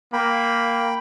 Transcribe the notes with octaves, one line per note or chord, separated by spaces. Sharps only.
A#3 G5 B5